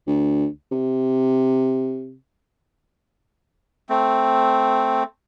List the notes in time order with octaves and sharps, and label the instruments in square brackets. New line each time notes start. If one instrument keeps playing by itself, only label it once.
[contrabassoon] D2
C3
[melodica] A3 C4